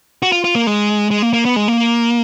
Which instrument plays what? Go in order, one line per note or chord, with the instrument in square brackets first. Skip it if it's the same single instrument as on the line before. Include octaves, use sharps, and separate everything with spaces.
[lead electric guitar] F#4
F4
F4
A#3
G#3
G#3
A#3
A#3
B3
G#3
A#3